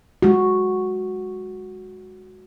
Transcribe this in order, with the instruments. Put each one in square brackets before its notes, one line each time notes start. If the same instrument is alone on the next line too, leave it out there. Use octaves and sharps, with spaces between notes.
[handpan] G#3 F#4